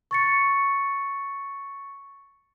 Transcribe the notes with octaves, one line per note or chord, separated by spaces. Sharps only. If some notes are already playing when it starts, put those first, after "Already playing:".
C#6 A6 C#7